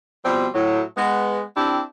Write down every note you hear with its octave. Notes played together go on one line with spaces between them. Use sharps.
B2 F3 G3 C4
A2 F#3
G#3 B3
C4 D4 E4 G4